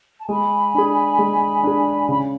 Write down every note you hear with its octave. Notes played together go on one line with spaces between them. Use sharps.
A5
G#3 G#5 B5
D4 G#4
G#3
D4 G#4
C#3 B5